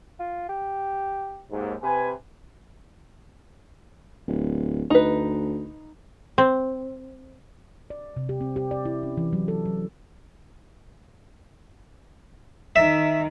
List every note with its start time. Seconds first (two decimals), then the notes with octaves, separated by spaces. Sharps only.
0.20 F4
0.49 G4
1.50 D#2 G#2
1.83 C3 B4 G#5
4.27 D1
4.90 D2 D#4 B4
6.38 C4
7.90 D5
8.16 C3
8.29 G4
8.41 C4
8.56 G4
8.71 D5
8.85 E4
9.03 C#4
9.17 E3
9.33 F#3
9.48 A4
9.66 F#3
12.76 D#3 E5